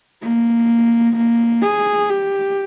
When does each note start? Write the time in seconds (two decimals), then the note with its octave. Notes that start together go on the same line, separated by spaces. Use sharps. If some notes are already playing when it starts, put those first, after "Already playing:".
0.23 A#3
1.17 A#3
1.62 G#4
2.09 G4